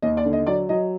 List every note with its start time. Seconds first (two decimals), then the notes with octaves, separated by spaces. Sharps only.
0.02 D#2 D#5
0.17 D5
0.25 D3
0.33 D#5
0.47 F#3 D5
0.69 F#3 D#5